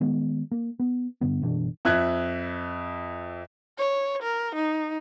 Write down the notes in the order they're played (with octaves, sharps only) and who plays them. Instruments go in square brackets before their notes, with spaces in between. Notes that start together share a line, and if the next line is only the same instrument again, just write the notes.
[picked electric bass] D#3 G#3 B3
A#3
B3
G2 D3 B3
F#1 B2 E3 D4
[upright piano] F2 E5 F#6 G#6
[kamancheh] C#5
A#4
D#4